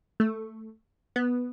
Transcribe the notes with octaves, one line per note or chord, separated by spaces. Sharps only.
A3
B3